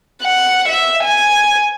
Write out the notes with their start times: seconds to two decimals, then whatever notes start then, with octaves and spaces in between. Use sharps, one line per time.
0.22 F#5
0.68 E5
1.03 G#5